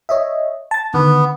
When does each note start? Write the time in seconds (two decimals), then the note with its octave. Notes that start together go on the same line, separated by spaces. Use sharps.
0.09 C#5 D#5 E5
0.71 A5 A6
0.94 D3 D#3 B3